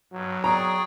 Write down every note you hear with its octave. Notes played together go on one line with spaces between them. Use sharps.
G2 F#3
G#4 D5 G5 A#5 C#6 D#6